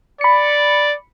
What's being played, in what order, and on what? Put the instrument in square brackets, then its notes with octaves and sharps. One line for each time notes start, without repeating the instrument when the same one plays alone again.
[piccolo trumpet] D5 [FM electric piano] B5 C#7